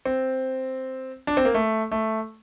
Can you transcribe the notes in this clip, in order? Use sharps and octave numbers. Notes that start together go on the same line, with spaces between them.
C4
D4
C4
A#3
A3
A3